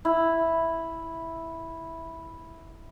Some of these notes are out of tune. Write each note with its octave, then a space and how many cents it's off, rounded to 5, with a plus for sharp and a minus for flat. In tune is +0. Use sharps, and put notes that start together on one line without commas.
E4 -5